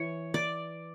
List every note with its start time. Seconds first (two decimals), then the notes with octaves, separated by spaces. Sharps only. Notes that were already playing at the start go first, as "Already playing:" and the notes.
Already playing: E3 C#5
0.34 D5